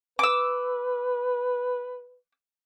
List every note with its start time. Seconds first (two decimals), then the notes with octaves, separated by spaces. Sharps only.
0.19 B4 D6 E6